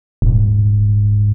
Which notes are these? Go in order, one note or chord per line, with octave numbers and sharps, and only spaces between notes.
D#1 G#2